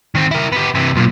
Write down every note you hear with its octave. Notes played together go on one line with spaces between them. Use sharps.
D#3 C4
E4 A#4
B3 G4
C3 E3
B1 A#2